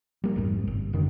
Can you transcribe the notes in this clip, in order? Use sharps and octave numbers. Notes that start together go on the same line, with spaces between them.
G3 A#3
A#1 F2 G#2
G1
F#2 D3 D#3